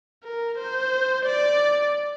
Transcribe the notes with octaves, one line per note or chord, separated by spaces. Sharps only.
A#4
C5
D5